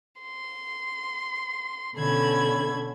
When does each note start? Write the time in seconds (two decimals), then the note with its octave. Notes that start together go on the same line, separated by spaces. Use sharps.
0.22 C6
1.96 B2 D3 C#4 A4 B5 G#6